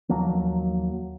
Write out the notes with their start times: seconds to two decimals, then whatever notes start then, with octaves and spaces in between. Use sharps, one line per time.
0.09 D#2 F3 F#3 A#3